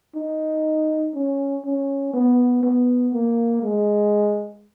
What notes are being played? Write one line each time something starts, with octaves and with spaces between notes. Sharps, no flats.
D#4
C#4
C#4
B3
B3
A#3
G#3